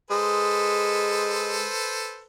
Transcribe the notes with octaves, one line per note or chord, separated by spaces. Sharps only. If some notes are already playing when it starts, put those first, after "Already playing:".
G#3 A4 B4 C5